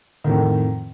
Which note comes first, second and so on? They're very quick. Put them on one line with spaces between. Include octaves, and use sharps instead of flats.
D#3 A2 F2